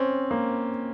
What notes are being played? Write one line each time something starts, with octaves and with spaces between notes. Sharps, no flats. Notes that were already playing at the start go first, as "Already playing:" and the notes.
Already playing: C4 C#4
A#3